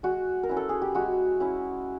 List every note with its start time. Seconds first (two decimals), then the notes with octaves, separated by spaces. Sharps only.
0.03 G#3 F#4
0.43 A#4
0.49 C#4 E4
0.57 A4
0.69 G#4
0.82 G4
0.95 G#3 F#4
1.40 C#4 E4